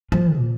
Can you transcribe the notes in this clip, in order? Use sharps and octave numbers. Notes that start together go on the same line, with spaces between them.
F3
A#2